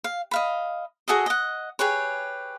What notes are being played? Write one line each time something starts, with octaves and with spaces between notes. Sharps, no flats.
F5
D#5 F5 B5
F#4 G#4 A4 D#5
D#5 F#5
G4 G#4 B4 C#5